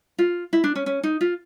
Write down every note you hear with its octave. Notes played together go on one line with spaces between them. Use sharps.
F4
E4
D4
C#4
C#4
D#4
F4